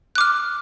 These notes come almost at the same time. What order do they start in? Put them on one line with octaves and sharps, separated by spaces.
F#6 D6 F6